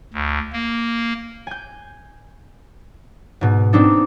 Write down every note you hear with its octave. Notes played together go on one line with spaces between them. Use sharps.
D2
A#3
G#5 G6
G#2 B2
C4 D4 D#4 A4